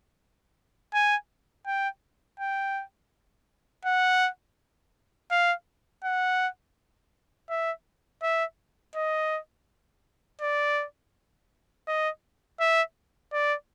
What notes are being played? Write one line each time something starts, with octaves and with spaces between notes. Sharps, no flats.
G#5
G5
G5
F#5
F5
F#5
E5
E5
D#5
D5
D#5
E5
D5